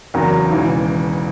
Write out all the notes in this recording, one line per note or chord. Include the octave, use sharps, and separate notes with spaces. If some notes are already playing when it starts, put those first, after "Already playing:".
E2 C#3 F#3 F#4 A#4
E1 D#2 C#3 E3